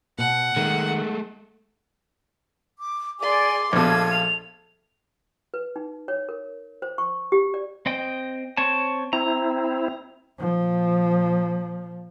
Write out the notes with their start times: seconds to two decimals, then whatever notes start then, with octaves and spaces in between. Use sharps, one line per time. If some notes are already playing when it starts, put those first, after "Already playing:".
0.18 B2 F#5
0.56 D#3 G#3 A3
2.78 D6
3.20 G#4 D5 G#5 C6 D6
3.73 A#1 B2 A3 F4 A4 G#6
4.11 F7
5.54 B4
5.76 D#4
6.08 C#5
6.29 A#4
6.82 C5
6.98 C#6
7.32 G4
7.54 D5
7.86 C4 D#5 G5
8.57 C4 C#5 A5
9.13 C4 E4 A#5
10.39 A#2 F3